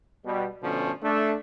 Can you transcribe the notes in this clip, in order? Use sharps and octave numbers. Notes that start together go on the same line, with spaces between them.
B2 G3
B2 D3 F3 A3 C#4
A3 D4